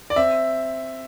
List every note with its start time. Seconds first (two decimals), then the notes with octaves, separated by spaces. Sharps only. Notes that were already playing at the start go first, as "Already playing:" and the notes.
0.10 D5
0.16 C4 E5